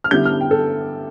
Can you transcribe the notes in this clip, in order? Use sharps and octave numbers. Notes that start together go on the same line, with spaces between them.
F6
D3 G3 B3 E4 G6
F6
G5
A4